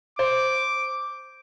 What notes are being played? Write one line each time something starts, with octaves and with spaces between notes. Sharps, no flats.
C5 D6